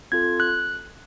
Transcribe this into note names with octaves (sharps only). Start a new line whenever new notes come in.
C4 F4 A4 G#6
F#6